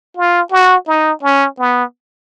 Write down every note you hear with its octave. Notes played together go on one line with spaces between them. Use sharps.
F4
F#4
D#4
C#4
B3